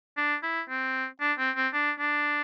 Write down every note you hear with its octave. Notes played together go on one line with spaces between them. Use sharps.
D4
E4
C4
D4
C4
C4
D4
D4